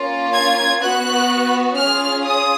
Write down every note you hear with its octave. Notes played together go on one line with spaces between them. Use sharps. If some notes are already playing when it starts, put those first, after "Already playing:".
Already playing: A#3 C#4 F4
G#6
B3 F#4 F#6
C#4 F4 G#4 F6
D#6